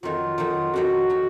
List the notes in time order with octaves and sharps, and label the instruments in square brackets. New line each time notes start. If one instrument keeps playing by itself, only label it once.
[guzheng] F2 D#3 F#3 [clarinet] F4
[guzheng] F2 D#3 F#3
[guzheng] F2 D#3 F#3 [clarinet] F#4
[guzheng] D#3 F#3